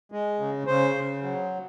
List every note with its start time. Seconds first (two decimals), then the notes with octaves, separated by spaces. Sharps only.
0.12 G#3
0.40 C#3
0.67 C#3 C5
0.95 C#3
1.22 F#3